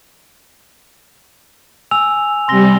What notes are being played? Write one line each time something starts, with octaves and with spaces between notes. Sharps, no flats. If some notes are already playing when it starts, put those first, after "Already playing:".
G#5 E6 F7
C3 G3 C6 A#6 G7